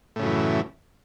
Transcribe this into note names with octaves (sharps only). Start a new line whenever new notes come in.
F#2 A2 C#3 E3